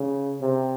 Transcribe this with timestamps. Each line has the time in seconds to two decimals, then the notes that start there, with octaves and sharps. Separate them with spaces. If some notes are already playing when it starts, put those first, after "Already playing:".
Already playing: C#3
0.41 C3